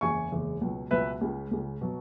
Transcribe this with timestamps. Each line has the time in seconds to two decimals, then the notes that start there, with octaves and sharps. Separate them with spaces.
0.01 F#1 E2 C#3 G#3 G#5 C#6
0.32 F#1 E2 C#3 G#3
0.61 C#2 B2 F#3
0.91 C#2 B2 F#3 B4 E5
1.21 C#2 C#3 G#3
1.51 C#2 C#3 G#3
1.81 B2 F#3